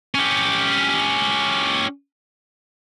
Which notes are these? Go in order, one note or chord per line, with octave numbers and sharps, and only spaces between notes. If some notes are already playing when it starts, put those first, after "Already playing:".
C#4 G4